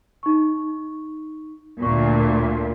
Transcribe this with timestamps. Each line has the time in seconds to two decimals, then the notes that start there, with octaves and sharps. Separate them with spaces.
0.23 D#4 C#6
1.82 D2 A#2 C#6